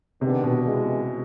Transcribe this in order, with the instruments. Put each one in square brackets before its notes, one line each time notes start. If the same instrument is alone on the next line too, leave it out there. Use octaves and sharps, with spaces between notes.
[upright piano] C3 [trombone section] D#3 G#3 B3 D4 G4
[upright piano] B2
[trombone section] C#3 E3 G#3